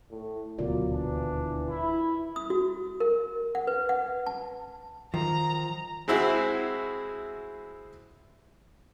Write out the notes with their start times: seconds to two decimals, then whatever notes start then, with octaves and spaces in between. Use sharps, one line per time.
0.11 A2
0.58 D#1 D2 B2 F#3 F4 A#4 D5
0.92 E3 D4
1.69 E4
2.36 D#6
2.50 F#4
3.00 A#4
3.55 F#5
3.67 B4
3.89 F#5
4.27 A5
5.14 D#3 F3 A#5
6.08 G#3 C4 E4 F#4 G#4